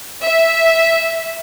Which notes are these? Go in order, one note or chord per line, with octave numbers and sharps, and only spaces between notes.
E5